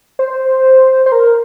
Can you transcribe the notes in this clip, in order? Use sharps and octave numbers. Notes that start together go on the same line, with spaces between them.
C5
C5
A#4